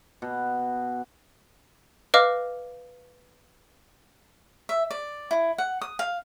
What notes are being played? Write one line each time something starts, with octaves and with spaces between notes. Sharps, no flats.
B2
B4 D#5 F5 D6 F6
E5
D5
E4
F#5
D#6
F5